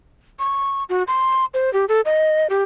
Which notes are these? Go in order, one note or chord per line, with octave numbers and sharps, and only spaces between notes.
C#6
F#4
C6
C5
G4
A4
D#5
G4